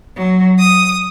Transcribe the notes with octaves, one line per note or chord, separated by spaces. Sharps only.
F#3
D#6